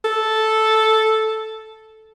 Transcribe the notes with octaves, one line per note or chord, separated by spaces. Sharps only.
A4